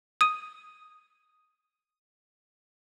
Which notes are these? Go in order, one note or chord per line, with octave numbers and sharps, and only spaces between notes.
D#6 D#7